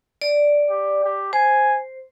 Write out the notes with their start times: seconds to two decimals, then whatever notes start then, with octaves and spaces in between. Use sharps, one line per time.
0.22 D5
0.70 G4
1.04 G4
1.33 C5 G#5